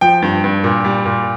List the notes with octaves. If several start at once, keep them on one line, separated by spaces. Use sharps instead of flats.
F3 G5
G2
G2
A#2
G3
A#2